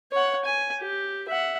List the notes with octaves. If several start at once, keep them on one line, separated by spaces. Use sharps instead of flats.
C#5 F#5
G#5
G4
E5 F#5